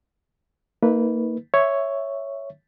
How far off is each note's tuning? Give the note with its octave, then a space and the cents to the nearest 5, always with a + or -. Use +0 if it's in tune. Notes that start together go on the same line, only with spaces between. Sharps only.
A#3 -15 D#4 +35 B4 -5
C#5 +0 E5 +0